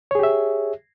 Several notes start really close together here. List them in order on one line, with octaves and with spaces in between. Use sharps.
C#5 G#4 G4 E5